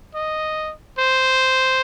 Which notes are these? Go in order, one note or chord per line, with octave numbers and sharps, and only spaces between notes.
D#5
C5